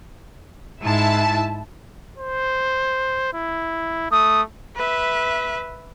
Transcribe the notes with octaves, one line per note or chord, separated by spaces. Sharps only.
G#2 E4 E5 A5
C5
E4
A3 D#6
B4 E5